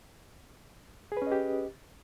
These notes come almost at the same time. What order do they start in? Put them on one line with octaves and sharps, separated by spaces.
G#4 B4 C#4 D#5 G4